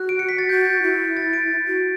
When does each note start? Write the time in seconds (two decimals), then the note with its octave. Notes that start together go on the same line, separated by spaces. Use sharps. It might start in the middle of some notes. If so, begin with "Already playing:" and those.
Already playing: F#4 F#6
0.09 D7
0.19 C#7
0.29 B6
0.39 A6
0.49 F#4 G6
0.82 E4
1.17 A6
1.33 D7
1.67 F#4